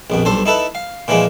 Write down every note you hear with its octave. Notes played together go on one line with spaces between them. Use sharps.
A#1 F2 B2
B1 G2 A4 C5
D#4 E4 A4 B4
F5
A#2 E3 F3 G#3 A#3